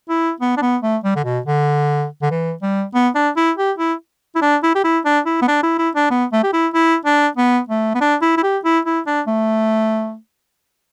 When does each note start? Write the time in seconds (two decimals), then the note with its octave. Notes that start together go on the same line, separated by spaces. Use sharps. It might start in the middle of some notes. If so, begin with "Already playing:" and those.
0.09 E4
0.41 B3
0.57 D4
0.62 B3
0.82 A3
1.04 G3
1.16 D3
1.25 B2
1.46 D3
2.22 D3
2.31 E3
2.62 G3
2.94 B3
3.15 D4
3.37 E4
3.57 G4
3.79 E4
4.36 E4
4.42 D4
4.63 E4
4.75 G4
4.84 E4
5.05 D4
5.26 E4
5.42 B3
5.48 D4
5.63 E4
5.78 E4
5.95 D4
6.10 B3
6.32 A3
6.43 G4
6.53 E4
6.73 E4
7.05 D4
7.37 B3
7.69 A3
7.95 B3
8.01 D4
8.22 E4
8.37 E4
8.43 G4
8.65 E4
8.85 E4
9.06 D4
9.27 A3